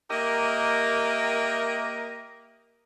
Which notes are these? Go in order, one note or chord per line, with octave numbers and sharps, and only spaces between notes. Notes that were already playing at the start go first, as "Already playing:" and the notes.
A#3 G4 A#4 D#5 E5